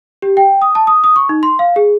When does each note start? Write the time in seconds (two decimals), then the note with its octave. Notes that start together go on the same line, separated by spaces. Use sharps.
0.22 G4
0.37 G5
0.62 D#6
0.75 A5
0.87 D#6
1.04 D#6
1.16 C#6
1.29 D#4
1.43 C6
1.59 F5
1.76 G#4